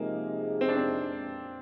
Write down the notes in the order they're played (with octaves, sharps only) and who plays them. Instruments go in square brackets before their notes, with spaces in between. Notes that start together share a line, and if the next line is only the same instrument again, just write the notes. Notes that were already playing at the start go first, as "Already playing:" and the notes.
Already playing: [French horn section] C3 F3 G#3 D#4 G#4 [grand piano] A#3
[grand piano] C4
D4
C4